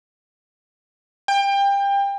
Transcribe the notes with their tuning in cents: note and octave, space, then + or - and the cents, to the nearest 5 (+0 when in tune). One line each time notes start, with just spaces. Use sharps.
G5 +25